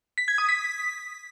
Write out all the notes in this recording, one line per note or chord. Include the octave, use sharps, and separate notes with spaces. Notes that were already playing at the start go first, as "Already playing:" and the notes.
B6
G#6
D#6
B6